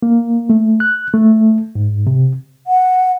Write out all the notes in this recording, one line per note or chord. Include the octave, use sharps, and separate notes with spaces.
A#3
A3
F#6
A3
G#2
C3
F#5